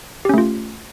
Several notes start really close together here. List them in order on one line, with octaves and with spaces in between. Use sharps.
G4 C#4 A3 F4